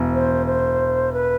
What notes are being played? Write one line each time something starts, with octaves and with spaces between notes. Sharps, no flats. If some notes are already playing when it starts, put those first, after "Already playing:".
Already playing: E1
C5
C5
B4